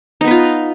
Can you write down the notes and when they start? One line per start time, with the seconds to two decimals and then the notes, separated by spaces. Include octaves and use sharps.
0.21 D#4
0.24 B3
0.27 B4
0.31 F4